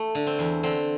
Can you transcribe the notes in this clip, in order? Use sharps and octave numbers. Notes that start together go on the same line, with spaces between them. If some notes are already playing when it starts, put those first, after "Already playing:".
Already playing: A3
D3
C4
E2
D3 C4